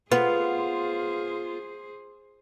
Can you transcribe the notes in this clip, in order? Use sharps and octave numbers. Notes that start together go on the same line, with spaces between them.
B3 F4 G#4 C5